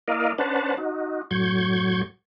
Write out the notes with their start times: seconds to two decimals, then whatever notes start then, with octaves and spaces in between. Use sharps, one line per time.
0.08 A#3 E4 A#4 D5 D#5 F5
0.38 C#4 D4 B4 C5 F#5 A5
0.77 D#4 F#4
1.31 F#2 A2 F#3 C#6 G6 G#6